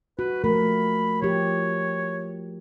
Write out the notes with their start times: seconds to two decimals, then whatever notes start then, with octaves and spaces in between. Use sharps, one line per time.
0.19 F#4 B4
0.44 F3 A3 A#4 B5
1.22 F3 G4 C#5